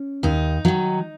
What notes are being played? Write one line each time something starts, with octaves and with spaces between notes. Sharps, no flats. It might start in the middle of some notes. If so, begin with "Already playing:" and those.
Already playing: C#4
D#2 D#4
D#3 F#3